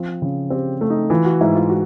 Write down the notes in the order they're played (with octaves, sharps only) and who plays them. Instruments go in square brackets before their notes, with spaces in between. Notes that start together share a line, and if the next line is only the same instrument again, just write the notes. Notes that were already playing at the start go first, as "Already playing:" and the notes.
Already playing: [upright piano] F3 C4
C#3
[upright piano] C4 [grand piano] G4
[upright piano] A3
[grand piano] D#4
[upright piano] E3 [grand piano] F4
[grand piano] F#4
[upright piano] G#2 [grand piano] E4
[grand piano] F4
F#4